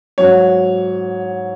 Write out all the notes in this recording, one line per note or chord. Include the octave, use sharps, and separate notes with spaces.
G#2 F#3 C#5